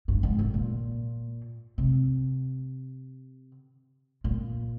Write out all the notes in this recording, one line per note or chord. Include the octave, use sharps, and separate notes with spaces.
G2
G#2
A2
A#2
C3
A#2